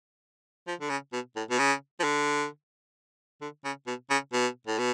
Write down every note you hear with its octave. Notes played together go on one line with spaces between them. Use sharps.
F3
D3
C#3
B2
A2
B2
C#3
F3
D3
D3
C#3
B2
C#3
B2
A2
B2